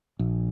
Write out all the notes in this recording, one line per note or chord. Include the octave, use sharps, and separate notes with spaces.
A#1